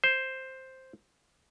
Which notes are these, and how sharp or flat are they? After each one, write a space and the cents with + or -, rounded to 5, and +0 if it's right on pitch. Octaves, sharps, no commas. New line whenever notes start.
C5 +5